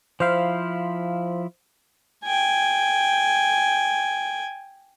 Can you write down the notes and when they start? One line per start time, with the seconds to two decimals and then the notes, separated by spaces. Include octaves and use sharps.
0.20 F3 E4 C5 F5
2.25 G5 G#5